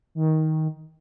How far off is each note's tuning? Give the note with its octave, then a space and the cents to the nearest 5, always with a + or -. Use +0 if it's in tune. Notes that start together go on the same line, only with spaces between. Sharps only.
D#3 +15